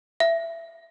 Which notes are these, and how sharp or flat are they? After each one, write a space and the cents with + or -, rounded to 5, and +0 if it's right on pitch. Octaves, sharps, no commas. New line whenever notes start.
E5 +15